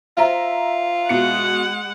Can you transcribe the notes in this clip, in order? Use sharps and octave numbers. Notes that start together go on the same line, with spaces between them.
F4 C5 E5 A#5
B2 G#3 F#5 C#7